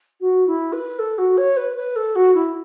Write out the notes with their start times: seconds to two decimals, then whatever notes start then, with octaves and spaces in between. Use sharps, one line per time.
0.20 F#4
0.47 E4
0.72 B4
0.99 A4
1.18 F#4
1.37 C#5
1.57 B4
1.76 B4
1.96 A4
2.15 F#4
2.34 E4